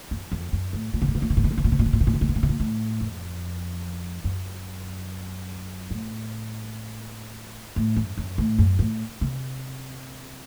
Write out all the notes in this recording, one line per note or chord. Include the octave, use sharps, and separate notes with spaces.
F#2
F2
F#2
A2
A#2
C3
A#2
C3
A#2
C3
A#2
C3
A#2
C3
A#2
C3
A#2
C3
A#2
C3
A#2
C3
A#2
C3
A#2
C3
A#2
A2
F2
F#2
A2
A2
F#2
F#2
A2
F#2
A2
C3